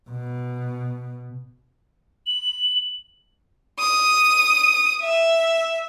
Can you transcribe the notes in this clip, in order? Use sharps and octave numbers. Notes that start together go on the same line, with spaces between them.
B2
F#7
D#6
E5